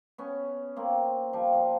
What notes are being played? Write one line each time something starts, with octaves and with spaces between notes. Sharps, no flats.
B3 C#4
A#3 C4
F3 G3
F3